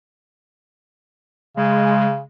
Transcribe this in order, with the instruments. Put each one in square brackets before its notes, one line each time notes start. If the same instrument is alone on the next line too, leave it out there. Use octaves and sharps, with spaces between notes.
[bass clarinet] C#3 [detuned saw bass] G#3